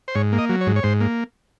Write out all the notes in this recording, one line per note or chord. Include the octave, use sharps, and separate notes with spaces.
C5
G#2 C#5
A#3
D#5
F#3
C#5
G#2
C#5
G#2 C5
A#3